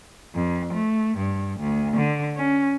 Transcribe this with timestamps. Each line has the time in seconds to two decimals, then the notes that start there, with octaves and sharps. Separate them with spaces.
0.35 F2
0.73 A3
1.17 G2
1.60 D2
1.97 D3
2.36 C#4